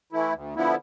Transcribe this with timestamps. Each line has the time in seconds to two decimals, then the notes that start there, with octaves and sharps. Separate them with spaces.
0.12 E3 A3 E4
0.33 D2
0.55 D3 F3 B3 E4